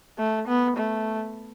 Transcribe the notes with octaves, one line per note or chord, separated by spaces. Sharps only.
A3
B3
A3